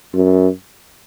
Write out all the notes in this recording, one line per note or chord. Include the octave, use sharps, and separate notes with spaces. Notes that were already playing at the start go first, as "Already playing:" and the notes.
F#2